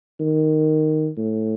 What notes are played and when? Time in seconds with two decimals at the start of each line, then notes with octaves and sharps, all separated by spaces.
0.20 D#3
1.17 A2